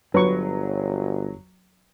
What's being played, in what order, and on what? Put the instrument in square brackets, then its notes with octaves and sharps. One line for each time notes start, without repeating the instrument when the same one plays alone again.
[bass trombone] G1 [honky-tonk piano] F#3 [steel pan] B4 C#6